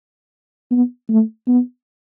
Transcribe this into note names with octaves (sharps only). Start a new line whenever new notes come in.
B3
A3
B3